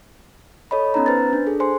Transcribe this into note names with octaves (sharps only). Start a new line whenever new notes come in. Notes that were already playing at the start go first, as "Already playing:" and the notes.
A4 C#5 D#5 B5
B3 C#4 D#4 A#5
B4 C5 A6
D4
G#4 A4
C5 G#5 C6